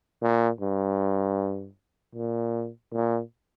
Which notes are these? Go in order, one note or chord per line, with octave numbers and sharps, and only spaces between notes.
A#2
G2
A#2
A#2